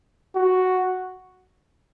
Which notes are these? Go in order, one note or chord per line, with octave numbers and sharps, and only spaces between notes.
F#4